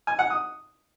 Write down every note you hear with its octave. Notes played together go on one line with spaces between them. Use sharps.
G#5
F#5
D#6